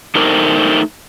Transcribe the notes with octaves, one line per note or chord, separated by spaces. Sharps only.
A3 D4 D#4 G4 A#4 C5